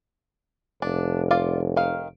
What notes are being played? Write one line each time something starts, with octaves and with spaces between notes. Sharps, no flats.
F1 D4
F4 D5 F5
D#3 F5